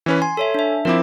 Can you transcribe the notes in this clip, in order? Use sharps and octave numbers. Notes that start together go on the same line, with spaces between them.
E3 C#4 B4
G#5 C6
A4 C#5 E5
D4 E5
F3 C4 E4 A#4 D6